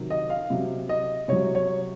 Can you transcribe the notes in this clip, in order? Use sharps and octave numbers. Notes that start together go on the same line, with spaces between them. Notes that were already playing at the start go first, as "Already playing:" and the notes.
Already playing: C3 D#3 F#3
D#5
F5
C3 F#3
D#5
C3 F#3 C#5
C#5